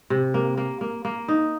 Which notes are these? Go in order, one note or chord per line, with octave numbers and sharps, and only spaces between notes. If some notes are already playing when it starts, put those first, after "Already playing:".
C3
A#3
A#3
A#3
A#3
D#4